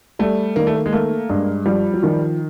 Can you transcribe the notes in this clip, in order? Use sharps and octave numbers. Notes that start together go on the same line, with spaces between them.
G3 A3
D#3 A#3
A3
A#3
G#3
A3 A#3
G2 G#3
F3 G3
F#3
D#3 F3